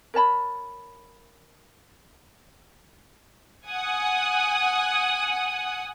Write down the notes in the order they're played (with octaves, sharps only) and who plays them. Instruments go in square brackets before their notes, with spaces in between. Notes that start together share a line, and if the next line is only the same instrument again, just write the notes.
[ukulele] A#4 C#5 A5 B5
[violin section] F#5 G#5 D#6 F#6